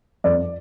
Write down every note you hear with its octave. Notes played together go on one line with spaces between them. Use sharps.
F2 D5